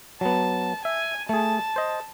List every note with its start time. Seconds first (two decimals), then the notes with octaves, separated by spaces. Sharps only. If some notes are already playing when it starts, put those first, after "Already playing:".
0.21 F#3 B3 A5
0.85 E5 G#5
1.29 A3 G#4 A5
1.76 C5 D#5